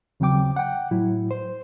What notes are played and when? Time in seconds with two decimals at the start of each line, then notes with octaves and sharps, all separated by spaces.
0.20 D#2 C#3 F#3 C4 G5 D6
0.56 F#5 G5
0.91 A2 F#3 E4
1.31 C5